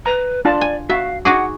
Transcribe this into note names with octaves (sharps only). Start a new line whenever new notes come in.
B4 A#5
D4 F4 D5 A5
G#5
F#4 E5 F5
D#4 F#4 G#4 F#5 D6